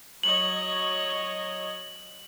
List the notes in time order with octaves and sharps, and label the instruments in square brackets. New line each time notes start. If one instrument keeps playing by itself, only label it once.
[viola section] F#3 C#5 D#5 [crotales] F#7